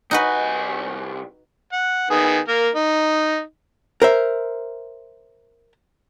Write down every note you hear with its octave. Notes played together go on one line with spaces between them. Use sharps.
C2 D#4 F#4 B4 G#5
F#5
D#3 B3 G#4
A#3 A#4
D#4
A#4 C5 E5